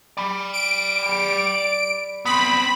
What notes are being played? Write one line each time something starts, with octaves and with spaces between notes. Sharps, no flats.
D5 B5
D7
B3 C4 B5